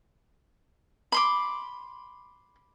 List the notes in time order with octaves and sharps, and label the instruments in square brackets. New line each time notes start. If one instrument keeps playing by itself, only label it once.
[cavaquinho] B5 C6 D6